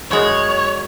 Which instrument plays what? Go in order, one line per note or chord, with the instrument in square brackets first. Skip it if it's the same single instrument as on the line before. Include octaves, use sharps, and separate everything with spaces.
[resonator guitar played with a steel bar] F#2 G#3 [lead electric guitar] C#5